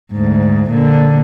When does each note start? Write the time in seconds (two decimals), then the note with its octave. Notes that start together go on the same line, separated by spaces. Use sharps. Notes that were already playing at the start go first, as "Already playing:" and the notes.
0.13 D2 G#2
0.71 A#2 D3